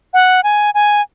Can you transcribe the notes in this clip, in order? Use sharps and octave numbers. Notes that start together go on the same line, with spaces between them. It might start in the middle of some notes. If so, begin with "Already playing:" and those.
F#5
G#5
G#5